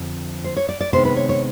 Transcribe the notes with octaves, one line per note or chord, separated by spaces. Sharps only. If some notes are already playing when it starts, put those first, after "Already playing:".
Already playing: F2 D3 F3 C4
C5
C#5
D5
D5
C3 D#3 G#3 B3 D4 C5
B4
C#5
C#5